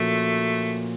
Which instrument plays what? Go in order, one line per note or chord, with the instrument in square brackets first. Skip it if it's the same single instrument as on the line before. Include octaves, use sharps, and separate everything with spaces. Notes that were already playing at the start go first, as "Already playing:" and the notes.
Already playing: [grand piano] A#2 F3 A#3 C#4 F#4 [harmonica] A3